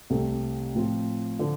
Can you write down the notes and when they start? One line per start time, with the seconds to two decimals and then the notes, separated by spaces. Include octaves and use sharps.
0.10 C2 C3 A3 C4
0.75 A2 F3 C4 F4
1.39 D3 F3